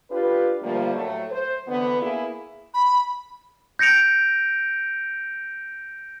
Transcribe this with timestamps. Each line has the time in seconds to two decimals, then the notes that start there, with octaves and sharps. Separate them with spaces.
0.11 D4 F4 G4 B4
0.62 D3 F3 G3 A3 A#3
0.95 A2 F#3 A3
1.30 C5
1.66 D3 E3 B3
2.01 A#3 B3 E4 G#4
2.74 B5
3.79 G6 A#6 C#7 D7 F7